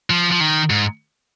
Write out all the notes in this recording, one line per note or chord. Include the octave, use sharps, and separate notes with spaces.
F3
F3
D#3
G#2